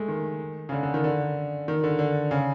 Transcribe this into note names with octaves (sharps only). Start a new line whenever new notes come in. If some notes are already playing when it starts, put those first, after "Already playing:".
Already playing: G#3 A3
D#3
C#3
D3
D3
D#3
D3
D#3
D3
D3
C#3